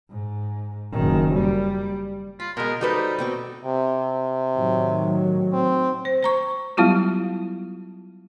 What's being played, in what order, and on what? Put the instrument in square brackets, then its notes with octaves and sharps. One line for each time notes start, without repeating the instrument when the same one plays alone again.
[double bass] G#2
F#1 D#3
G3
[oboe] F4 [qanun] B5
[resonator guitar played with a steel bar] B2 G#3 [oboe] A#4
[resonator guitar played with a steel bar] G3 A4 B4 [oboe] D#4 [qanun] F#4 C5
[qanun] B2 C4 C#6
[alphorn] C3
[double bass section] A2 D#3 F#3
[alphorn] C4
[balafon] C5
C5 A#5 C#6
F#3 G3 B3 E4 F4 G4